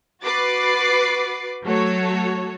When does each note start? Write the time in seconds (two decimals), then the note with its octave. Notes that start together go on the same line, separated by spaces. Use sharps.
0.22 F#4 B4 D6 A6 C7
1.64 F#3 A3 F#4 A4 C#5